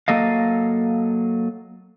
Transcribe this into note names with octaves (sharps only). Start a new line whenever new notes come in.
F#3 A#3 A4 D#5 F5